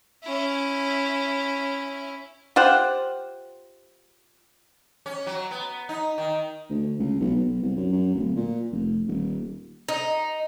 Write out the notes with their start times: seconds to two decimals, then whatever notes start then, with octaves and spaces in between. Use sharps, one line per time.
0.23 C#4 E4
2.56 F4 G4 C5 F#5
5.06 C#4
5.26 F#3
5.51 B3
5.89 D#4
6.18 D#3
6.70 D2
6.99 C#2
7.20 B1
7.36 B1
7.62 C2
7.76 F#2
7.92 F#2
8.15 D1
8.36 A#2
8.72 F1
9.08 D#1
9.89 D#4